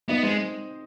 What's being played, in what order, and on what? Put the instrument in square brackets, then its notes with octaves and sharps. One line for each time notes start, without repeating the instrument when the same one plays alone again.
[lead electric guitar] B3 [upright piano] D#4 D#5
[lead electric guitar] G#3 [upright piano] C4 C5